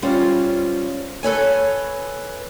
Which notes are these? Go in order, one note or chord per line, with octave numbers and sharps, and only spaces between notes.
G3 C4 C#4 F4 C5
A4 B4 C#5 G#5